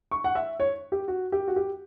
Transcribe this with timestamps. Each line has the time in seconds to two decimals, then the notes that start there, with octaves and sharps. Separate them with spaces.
0.11 C#6
0.24 F#5
0.35 E5
0.60 C#5
0.92 G4
1.08 F#4
1.32 G4
1.48 F#4
1.56 G4